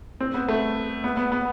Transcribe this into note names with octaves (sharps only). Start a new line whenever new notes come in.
C4
B3
A3
B3
B3
B3